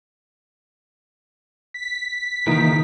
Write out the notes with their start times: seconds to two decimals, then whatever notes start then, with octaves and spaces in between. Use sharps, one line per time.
1.74 B6
2.47 C#2 D#3 E3 A#3 D#4